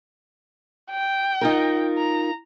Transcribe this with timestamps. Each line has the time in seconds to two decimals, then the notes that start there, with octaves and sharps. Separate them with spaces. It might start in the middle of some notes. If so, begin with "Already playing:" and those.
0.90 G5
1.41 D#4 F4 A#4
1.97 A#5